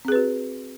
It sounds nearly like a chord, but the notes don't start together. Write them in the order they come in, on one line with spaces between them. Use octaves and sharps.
C4 G#4 B4 F#4